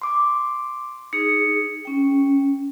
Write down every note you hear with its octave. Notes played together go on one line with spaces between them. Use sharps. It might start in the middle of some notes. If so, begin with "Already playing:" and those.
C6 D6
D#4 G#4 C#7
C#4 G5